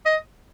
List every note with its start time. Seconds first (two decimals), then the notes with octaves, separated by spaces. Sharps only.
0.06 D#5